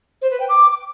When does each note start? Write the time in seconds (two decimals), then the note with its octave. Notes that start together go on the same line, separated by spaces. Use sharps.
0.21 C5
0.30 B4
0.40 G5
0.49 D6